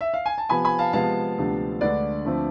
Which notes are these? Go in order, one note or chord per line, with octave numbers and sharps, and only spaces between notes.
E5
F5
G#5
A5
C3 F3 B3 G#5 B5
G#5 B5
F5 A5
C3 F3 G#3 B3 F5 A5
D2 C3 F3 B3 D4
D2 D3 G#3 D4 B4 D5
D2 D3 F3 A3 C4